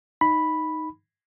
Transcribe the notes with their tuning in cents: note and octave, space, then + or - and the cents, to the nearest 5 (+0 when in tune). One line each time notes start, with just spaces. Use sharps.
D#4 +0 B5 +0